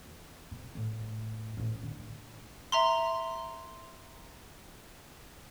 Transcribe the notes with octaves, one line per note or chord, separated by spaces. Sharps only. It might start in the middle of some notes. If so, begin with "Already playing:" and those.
E2
C3
A2
A1 A2
D3
E5 A#5 C6